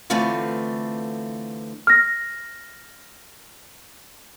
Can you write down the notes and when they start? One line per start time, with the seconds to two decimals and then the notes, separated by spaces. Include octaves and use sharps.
0.10 D3 E3 A3 C4 F4 B4
1.87 F6 A#6